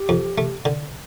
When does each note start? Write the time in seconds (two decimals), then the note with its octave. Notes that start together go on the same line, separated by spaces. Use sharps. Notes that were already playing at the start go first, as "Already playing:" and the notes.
Already playing: G4
0.09 F2
0.38 A3
0.65 D3